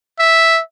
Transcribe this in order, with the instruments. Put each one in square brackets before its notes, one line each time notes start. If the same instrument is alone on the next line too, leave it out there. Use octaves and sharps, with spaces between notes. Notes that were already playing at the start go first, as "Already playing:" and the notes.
[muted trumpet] E5